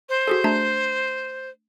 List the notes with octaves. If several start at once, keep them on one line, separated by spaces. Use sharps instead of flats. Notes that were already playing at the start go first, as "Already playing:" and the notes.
C5
F#4 G#4 A4
A3 D4 A#5